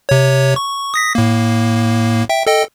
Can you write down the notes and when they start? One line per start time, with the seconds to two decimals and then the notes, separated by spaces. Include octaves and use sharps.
0.09 C3 C#5
0.56 C#6
0.94 D#6 A#6 B6
1.15 A2 A#3
2.29 E5 G5
2.47 A4 D#5 G5